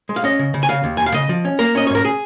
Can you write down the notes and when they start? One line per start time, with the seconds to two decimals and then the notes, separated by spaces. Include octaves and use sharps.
0.09 G#3
0.16 F5
0.24 C#4 D#5
0.39 C#3
0.54 C#3
0.63 G#5
0.69 C#3 F5
0.84 D#2
0.97 D#2 G#5
1.06 F5
1.14 C#3 D#5
1.29 F3
1.45 C#4
1.59 A#3 A#4
1.75 C#4 D#5
1.87 C#5
1.90 G#2 A#4
2.05 G#4